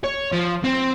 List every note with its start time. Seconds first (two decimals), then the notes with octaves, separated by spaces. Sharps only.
0.04 C#5
0.32 F3
0.64 C4